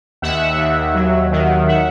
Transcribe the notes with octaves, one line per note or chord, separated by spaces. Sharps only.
D#2 E5 F#5
D#2
F#3
D#3
E5 F#5